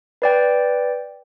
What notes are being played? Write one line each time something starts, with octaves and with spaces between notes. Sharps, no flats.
B4 D5 G5